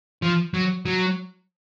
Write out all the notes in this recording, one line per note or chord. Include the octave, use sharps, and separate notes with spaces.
F3
F#3
F#3